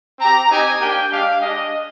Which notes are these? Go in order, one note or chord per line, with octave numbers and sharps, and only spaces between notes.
C4 G4 A#5
C4 D#4 G4 G#5
A#3 D4 G4 G5
G#3 D4 G4 F5
G#3 D4 G4 D#5